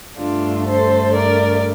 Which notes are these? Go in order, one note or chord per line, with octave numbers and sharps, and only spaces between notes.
G2 D3 A3 D4 F4
A4 C5
A#4 D5